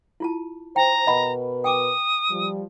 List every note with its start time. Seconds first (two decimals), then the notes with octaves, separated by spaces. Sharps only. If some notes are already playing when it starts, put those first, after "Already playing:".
0.20 E4 F4 A5
0.76 C5 G5 A#5
1.07 B2 A#4 B4 D#5 F#5 B5
1.64 G5 G#5 D6 D#6
2.30 F3 G3